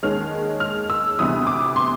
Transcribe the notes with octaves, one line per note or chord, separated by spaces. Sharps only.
D#2 D#3 G#3 C#4 F6
F6
E6
D2 C3 E3 G3 B3 D#6
D6
C6